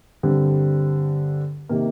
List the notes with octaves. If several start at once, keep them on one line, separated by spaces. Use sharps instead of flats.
G2 D3 G3 C4
C3 D#3 A#3